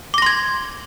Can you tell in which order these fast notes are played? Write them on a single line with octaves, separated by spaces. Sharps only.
D6 A#6 C6 G#6